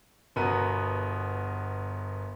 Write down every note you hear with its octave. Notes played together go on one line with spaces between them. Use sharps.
G1 B2 B3 A#4 B5 D#7